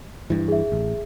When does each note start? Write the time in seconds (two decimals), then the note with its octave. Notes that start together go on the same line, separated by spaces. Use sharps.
0.30 G2 E3
0.48 G#4 E5
0.72 A1